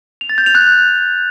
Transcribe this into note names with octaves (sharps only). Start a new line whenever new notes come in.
F7
A6
G6
F7
F#6